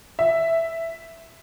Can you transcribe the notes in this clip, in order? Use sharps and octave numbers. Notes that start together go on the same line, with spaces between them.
E5